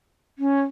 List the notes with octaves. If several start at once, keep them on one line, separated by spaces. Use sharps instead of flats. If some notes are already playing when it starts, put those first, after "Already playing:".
C#4